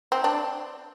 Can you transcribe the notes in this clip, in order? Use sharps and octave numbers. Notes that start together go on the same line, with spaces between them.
C4
D4